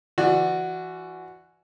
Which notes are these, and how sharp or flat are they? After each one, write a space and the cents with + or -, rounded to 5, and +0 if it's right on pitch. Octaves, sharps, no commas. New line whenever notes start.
E3 +35 F#4 +0 D5 +25